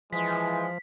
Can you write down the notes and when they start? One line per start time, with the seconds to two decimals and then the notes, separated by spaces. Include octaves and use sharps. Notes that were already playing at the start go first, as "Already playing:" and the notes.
0.13 E3 F3 G#3 B6